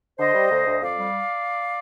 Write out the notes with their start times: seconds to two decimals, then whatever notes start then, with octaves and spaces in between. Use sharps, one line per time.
0.19 D3 C5 D#5
0.35 G3
0.51 D2
0.66 D2
0.81 F2 D5 F5
0.97 G3